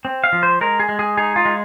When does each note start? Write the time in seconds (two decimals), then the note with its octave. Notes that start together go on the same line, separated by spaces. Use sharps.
0.05 C4
0.24 F5
0.33 F3
0.43 C5
0.61 G#3 A#4
0.80 G#4
0.89 G#3
0.99 G#4
1.17 D#4 G#4
1.36 F4
1.45 G#3